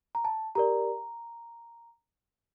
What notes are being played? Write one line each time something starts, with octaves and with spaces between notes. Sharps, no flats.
A#5
A5
G4 A#4 D5 A#5